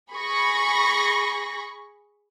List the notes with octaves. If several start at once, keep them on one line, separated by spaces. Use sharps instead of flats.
G#4 B5 C#6 A#6